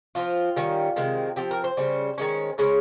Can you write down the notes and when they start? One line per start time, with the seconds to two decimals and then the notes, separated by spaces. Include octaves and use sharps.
0.15 F3 C4 F4
0.56 D#3 G3 C#4
0.96 C3 D#3 G#3 C4
1.36 F3 C4 G4
1.51 A#4
1.64 C5
1.77 C#3 G3 C#4
2.18 D#3 G#3 C#4
2.58 C#3 G#3 C#4 C#5